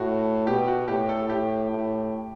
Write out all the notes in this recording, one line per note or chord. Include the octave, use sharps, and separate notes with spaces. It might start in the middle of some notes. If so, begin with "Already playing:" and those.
Already playing: A2 F#4
B2 G4
F#4
A2 G4
A4
A2 G4
A2